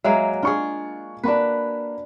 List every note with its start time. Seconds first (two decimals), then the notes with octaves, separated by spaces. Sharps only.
0.04 F#3 G#3 A#3 E5
0.42 D4 F4 G#4 C#6
1.23 A#3 D4 F#4 B4 B5